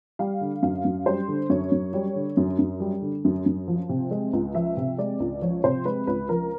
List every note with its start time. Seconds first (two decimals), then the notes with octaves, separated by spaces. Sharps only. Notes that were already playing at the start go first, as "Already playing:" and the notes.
0.19 G3 F5
0.41 D3
0.62 F#2 F5
0.85 F#2
1.06 G3 C5
1.28 D3
1.50 F#2 C#5
1.72 F#2
1.93 G3 C#5
2.15 D3
2.37 F#2
2.59 F#2
2.80 G3
3.02 D3
3.25 F#2
3.46 F#2
3.68 F3
3.89 C3
4.11 G#3
4.33 C#2
4.55 F3 E5
4.77 C3
4.98 G#3 D5
5.20 C#2
5.42 F3 C#5
5.64 C3 C5
5.85 G#3 B4
6.07 C#2 B4
6.29 F3 A#4